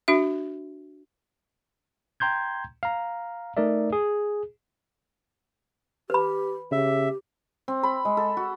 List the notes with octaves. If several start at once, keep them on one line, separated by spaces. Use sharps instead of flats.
D4 F#4 E5
G5 A#5 C6 G6 G#6
F5 A#5
A3 D#4 A#4 D5 E5
G#4
G4 B4 B5
C#3 G4 E5
C4
B5
G#3
A4
F#4